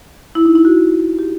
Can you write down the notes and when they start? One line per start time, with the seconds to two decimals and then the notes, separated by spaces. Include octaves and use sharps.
0.35 E4
0.45 D#4
0.55 E4
0.65 F#4
1.19 G4